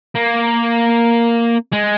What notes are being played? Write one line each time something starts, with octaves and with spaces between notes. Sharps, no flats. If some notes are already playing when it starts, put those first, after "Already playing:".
A#3
G#3